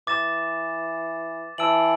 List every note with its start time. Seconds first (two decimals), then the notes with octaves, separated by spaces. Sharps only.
0.07 E3 D6 A6 E7
1.58 E3 A5 E6 D7 F#7